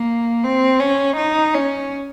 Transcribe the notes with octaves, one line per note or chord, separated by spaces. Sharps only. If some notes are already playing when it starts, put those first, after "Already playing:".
Already playing: A#3
C4
C#4
D#4
C#4